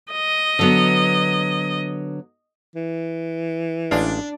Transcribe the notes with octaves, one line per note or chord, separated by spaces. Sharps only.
D#5
D3 F#3 B3
E3
A1 G#3 D4 F5